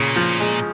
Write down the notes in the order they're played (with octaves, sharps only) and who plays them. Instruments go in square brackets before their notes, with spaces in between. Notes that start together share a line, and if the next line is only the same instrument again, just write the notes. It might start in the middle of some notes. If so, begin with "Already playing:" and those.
Already playing: [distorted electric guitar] A#2 [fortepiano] C#3
[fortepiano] F3
G#3